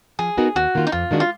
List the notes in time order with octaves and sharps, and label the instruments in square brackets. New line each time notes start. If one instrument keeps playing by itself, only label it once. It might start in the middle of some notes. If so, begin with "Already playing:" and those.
[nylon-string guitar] F3 [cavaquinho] G#4
[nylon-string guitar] B3 D#4 F#4 A#4
[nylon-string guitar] D#2 [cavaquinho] F#4
[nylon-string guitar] D#3 A#3 F4
[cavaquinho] D#4
[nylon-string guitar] F2 [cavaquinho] F4
[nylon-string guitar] D#3 G#3 D4 F#4
[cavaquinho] F4